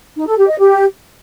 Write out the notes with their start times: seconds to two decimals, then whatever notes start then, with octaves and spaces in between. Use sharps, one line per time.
0.17 D#4
0.27 A4
0.38 G4
0.48 D#5
0.58 G4